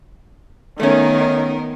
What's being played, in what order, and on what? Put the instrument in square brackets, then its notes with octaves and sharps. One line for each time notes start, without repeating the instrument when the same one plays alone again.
[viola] D#3 [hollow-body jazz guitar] A3 C#4 [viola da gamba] B3 D#4 A#4